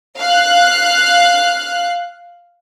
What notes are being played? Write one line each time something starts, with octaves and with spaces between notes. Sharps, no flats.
F5 F#6